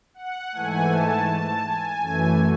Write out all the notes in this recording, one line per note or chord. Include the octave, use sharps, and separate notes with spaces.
F#5
G#2 E3 A3 G#5
A5
A5
G#5
F#2 E3 A3